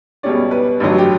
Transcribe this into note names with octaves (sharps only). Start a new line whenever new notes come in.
C#2 B2 G3 C#4 D5
B4
A1 G2 D3 F#3
G4